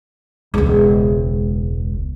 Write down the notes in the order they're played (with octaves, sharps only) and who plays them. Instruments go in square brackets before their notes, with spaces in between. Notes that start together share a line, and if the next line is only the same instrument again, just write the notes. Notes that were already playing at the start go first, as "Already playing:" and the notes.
[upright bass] E1 C#2